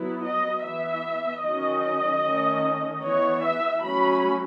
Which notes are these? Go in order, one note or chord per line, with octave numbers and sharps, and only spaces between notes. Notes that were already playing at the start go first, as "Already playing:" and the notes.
Already playing: F#3 B3 E4
D#5
E3 B3 E5
D#3 F#3 C#4 D#5
D#3 A3 C#4
E3 B3 C#5
E5
F#3 A3 C#4 B5